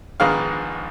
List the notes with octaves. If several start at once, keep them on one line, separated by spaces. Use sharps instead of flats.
A#1 G#2 D#3 G#3 B3 F5